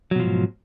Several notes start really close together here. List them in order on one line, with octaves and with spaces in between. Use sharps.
F#3 B2 F3 G#2